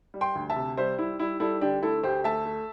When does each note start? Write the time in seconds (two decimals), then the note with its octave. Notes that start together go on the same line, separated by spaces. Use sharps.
0.14 G3
0.21 G5 C6
0.35 D2
0.50 E5 A5
0.56 C3
0.77 G3 C5 E5
0.99 G3 E4
1.19 G3 E4
1.40 G3 E4 A4
1.61 D3 D4 G4
1.83 A3 E4 A4
2.03 D2 G4 C5
2.24 A3 E5 A5
2.45 A3